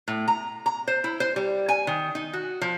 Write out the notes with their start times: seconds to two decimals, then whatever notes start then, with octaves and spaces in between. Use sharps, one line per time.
0.08 A2
0.28 A#5
0.66 A#5
0.88 C5
1.04 E4
1.20 C5
1.36 G3
1.69 G#5
1.87 D#3
2.15 D#4
2.33 F#4
2.61 F3